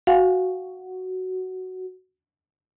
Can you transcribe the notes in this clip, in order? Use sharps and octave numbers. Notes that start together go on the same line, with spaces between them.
F#4 F5 F#5 G#5